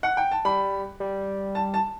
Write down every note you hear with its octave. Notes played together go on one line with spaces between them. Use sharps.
F#5
G5
A5
G3 B5
G3
A5
A5